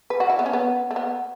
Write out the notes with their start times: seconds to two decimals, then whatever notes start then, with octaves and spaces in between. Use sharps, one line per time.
0.10 B4
0.20 F#4
0.29 E4
0.39 B3
0.46 C#4
0.53 B3
0.91 A3
0.96 B3